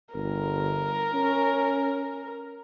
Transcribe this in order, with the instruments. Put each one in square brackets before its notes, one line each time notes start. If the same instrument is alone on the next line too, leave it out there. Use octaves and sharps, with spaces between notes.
[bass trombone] G1 [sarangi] A#4
[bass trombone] C#4